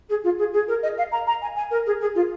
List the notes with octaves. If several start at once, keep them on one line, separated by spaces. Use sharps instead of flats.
G#4
F4
G#4
G#4
A#4
D#5
F5
A#5
A#5
G#5
G#5
A#4
G#4
G#4
F4